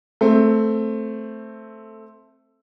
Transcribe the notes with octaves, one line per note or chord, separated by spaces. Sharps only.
A3 C4